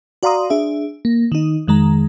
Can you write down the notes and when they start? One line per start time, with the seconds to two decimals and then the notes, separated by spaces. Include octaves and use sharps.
0.23 F#4 D5 F5 A#5 C6 D#6
0.50 D4 G#4 E5
1.05 A#3
1.32 D#3 D#4
1.68 F2 D#3 G#3 A#5